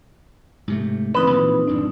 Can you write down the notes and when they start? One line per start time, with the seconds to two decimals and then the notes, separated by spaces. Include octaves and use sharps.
0.68 G#2 C3 A3
1.14 A1 C#3 C4 D#4 B4
1.30 A#2 E3 F3
1.68 D#1 G2 D4